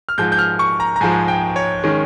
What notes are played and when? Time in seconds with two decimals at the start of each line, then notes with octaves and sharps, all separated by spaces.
0.09 F6
0.18 G#2 F3 G#3 G6
0.32 G6
0.39 F6
0.59 C#6
0.80 A#5
0.96 A#5
1.01 G#2 F3 G#3 G#5
1.28 G5
1.56 C#5
1.83 D#3 G#3 C#4